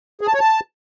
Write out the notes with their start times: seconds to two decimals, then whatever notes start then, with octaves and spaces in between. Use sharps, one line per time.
0.21 G#4
0.27 A5
0.34 C#5
0.40 A5